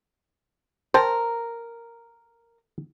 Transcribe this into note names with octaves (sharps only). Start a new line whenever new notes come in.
A#4 C5 G5 A5